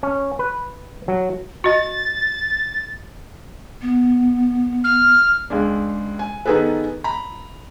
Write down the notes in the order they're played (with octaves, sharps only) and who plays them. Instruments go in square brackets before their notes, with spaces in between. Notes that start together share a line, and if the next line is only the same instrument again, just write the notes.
[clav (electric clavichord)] C#4
B4
F#3
[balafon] F#4 D#5 [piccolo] A6
[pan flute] B3
[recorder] F6
[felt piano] C#2 G#3 D4
G#5
D#3 B3 D#4 G#4 A4 B4
A#5 B5